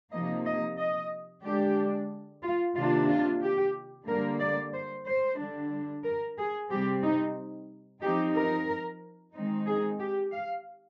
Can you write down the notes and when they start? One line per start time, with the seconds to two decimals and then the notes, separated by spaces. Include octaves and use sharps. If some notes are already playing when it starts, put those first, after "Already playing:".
0.12 C3 F3 A#3 D#4 D#5
0.45 D#5
0.79 D#5
1.43 D3 G#3 D4 G4
2.43 F4
2.75 C3 D#3 A#3 D4 F4
3.08 F4
3.42 G4
4.07 D3 G3 A#3 A#4
4.40 D5
4.73 C5
5.06 C5
5.39 D3 G3 D4
6.04 A#4
6.37 G#4
6.71 C3 G3 C4 G4
7.04 D#4
8.02 F3 C4 D#4 G4
8.35 A#4
9.34 D#3 G#3 C4 D#4
9.67 G#4
9.99 G4
10.33 F5